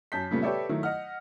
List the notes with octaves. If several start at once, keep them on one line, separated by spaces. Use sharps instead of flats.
F#2 A5 G6 B6
A#2 C#3 G3 A3 B3
G4 A4 B4 C#5 D5 E5
D#3 F#3 A3 E4
D#5 F#5 F6